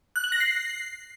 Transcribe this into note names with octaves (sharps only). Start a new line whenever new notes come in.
F#6
F#7
A#6
C7